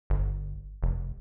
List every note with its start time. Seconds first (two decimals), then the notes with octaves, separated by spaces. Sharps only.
0.10 G1
0.83 F1